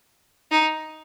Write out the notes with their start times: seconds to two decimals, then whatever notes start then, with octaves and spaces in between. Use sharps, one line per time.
0.51 D#4